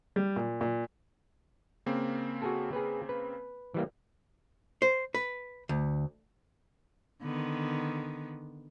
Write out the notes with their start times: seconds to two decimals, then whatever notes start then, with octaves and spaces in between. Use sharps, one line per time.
0.16 G3
0.36 A#2
0.61 A#2
1.86 C#3 A#3 C4
2.42 F#4 G#4 A4
2.73 G#4 B4
3.09 B4
3.74 E3 G3 A#3
4.82 C5
5.14 B4
5.69 D2
7.22 D3 D#3 B3